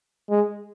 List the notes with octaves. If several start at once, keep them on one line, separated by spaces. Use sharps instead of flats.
G#3